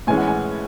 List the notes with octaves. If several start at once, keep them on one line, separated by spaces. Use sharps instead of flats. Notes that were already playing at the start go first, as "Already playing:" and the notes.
A2 E3 G#3 C#4 G#5
F#5
G#5